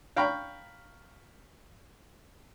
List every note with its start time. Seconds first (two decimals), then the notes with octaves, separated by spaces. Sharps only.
0.16 F5 G5 A#5 B5 C#6